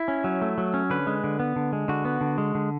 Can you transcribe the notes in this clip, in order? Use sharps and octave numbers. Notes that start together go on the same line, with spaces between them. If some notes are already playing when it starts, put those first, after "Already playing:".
Already playing: E4
C#4
F#3
A3
F#3
C#4
D3 B4
G#3
D3
B3
D3
G#3
D3 F#4
B3
D3
G#3
D3